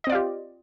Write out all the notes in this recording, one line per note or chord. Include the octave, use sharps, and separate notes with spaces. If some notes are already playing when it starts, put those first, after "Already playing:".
C4 F4 G4 D5 D#5